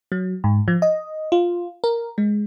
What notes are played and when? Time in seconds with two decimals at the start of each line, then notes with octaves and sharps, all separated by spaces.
0.12 F#3
0.44 G#2
0.68 F3
0.82 D#5
1.32 F4
1.84 A#4
2.18 G#3